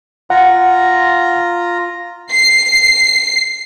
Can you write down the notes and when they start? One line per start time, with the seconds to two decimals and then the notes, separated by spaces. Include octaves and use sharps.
0.30 F4 F#5 A#5
2.31 C7